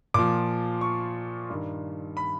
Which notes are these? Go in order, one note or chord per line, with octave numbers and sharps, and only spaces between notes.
A#2 F3 D6
C#6
G2 D#3
B5